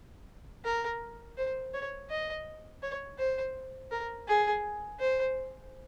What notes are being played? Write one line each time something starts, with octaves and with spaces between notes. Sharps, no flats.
A#4
C5
C#5
D#5
C#5
C5
A#4
G#4
C5